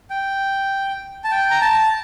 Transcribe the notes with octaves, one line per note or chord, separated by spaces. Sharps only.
G5
A5
G5
A#5
A5